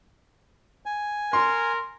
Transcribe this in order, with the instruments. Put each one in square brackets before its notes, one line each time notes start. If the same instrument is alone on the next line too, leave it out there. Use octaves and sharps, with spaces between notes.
[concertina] G#5
[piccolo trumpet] A#4 [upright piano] C6